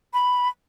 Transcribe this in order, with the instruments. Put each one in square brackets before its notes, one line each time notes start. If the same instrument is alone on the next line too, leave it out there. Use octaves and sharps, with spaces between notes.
[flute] B5